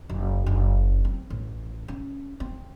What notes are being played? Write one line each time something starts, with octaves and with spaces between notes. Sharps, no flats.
F#1
F#1
C4
A1
C#4
C4